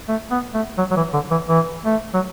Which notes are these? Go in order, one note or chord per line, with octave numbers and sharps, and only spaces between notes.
A3
B3
A3
F#3
F#3
E3
D3
E3
E3
A3
F#3